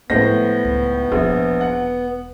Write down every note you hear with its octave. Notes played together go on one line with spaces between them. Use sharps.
A2 F3 G#3 B3 C5 A#6
C#2 D#4
E1 A#1 E2
F#5